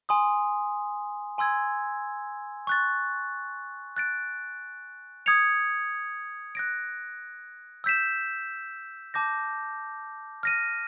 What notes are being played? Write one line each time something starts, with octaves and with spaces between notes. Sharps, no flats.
G#5 C6 D#6
G#5 C6 E6 G#6
C#6 F#6 A6
F#6 A6 D7
D#6 G#6 C#7 F7
F#6 A#6 D7
E6 G6 B6 E7
A5 D6 G6 A#6
F6 A#6 D#7